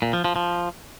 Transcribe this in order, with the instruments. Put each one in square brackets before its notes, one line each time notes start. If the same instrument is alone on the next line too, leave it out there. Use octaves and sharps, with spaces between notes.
[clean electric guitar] A#2
F3
F3
F3